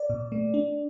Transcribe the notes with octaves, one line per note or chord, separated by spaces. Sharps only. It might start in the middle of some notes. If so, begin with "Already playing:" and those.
Already playing: D5
A#2
A3
D4